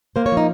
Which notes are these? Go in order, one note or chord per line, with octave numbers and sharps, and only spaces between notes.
A#3 C5
C#5
F3
D#4